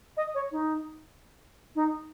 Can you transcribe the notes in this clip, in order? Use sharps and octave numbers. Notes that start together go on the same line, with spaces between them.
D#5
C#5
D#4
D#4